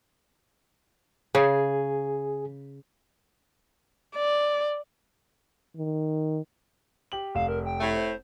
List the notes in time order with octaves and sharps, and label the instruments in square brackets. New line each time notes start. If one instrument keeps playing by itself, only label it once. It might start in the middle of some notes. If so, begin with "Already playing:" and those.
[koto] C#3 [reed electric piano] G#4 G#5
[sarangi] D5
[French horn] D#3
[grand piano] G4 F#7
[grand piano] F1 E7 [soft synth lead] F5
[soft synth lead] A#4
G5
[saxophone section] A2 A3
[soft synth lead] C5